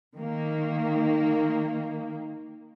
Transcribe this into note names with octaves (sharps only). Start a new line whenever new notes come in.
D#3 A#3